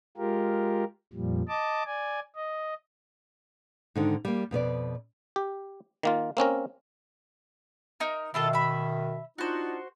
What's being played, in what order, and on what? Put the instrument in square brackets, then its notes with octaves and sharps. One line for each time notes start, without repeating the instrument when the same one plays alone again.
[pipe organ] G#3 F4 G4 A#4
F2 A#2 F3 G3
D#5 A5 D6
D5 G#5
D#5
[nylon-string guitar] G#2 D3 D#3
G3 A#3
F2 B2 B4 D5
[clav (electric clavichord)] G4
D#3 A#3 F4
A#3 C4 C#4 A#4
[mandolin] D#4 A#4
[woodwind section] B2 D#3 [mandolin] E4 F4 A4
[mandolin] E5 B5
[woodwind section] D4 D#4 F4 [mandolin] F#4 C5